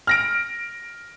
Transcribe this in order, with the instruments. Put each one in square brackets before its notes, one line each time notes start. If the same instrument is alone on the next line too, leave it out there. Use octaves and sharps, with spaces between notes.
[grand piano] F6 A#6 D7